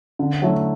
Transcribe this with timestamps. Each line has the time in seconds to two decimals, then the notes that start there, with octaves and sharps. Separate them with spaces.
0.19 D3
0.42 F#3 A3 E4